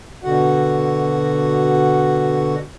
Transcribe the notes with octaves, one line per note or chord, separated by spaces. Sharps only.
B2 D3 F#4 F#5